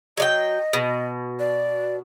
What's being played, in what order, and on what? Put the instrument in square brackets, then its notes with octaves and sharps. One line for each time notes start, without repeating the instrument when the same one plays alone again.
[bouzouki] F#3 D5 G5 [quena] D#5
[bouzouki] B2
[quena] D5